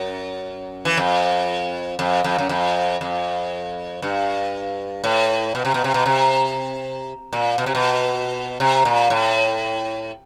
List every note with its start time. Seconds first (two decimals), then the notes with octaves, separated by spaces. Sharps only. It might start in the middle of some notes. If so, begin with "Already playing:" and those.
Already playing: F#2
0.85 E3
0.97 F2
1.99 F2
2.24 F2
2.38 F#2
2.49 F2
3.01 F2
4.02 G2
5.04 A2
5.55 B2
5.65 C3
5.74 B2
5.84 C3
5.94 B2
6.06 C3
7.33 A#2
7.58 B2
7.66 C3
7.75 B2
8.60 C3
8.85 A#2
9.10 A2